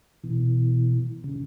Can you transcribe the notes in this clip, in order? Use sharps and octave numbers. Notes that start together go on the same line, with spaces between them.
B2 E3
C#3